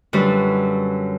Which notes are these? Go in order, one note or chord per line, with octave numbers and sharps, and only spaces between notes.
F#2 D3 G3 F#4 B4